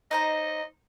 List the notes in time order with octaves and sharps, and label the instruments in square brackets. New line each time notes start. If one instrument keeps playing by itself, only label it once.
[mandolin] D#4 C5 A#5 [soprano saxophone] D#5